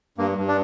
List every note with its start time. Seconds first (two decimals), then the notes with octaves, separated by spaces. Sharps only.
0.18 G2 A#3
0.38 G2
0.48 D4